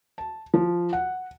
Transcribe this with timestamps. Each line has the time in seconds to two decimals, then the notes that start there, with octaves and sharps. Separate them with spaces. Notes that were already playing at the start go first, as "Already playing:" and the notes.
0.18 A5
0.54 F3
0.93 F#5